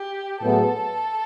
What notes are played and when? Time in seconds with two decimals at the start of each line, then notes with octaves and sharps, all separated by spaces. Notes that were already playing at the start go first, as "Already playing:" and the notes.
Already playing: G4
0.41 A2 F#3 B3 E4 G#4 A4